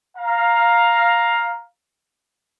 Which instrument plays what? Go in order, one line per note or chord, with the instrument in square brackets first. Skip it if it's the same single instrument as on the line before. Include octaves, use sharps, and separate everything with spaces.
[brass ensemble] F5 A#5